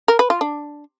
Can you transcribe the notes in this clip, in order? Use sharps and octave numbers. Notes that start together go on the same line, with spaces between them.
A#4
B4
F4
D4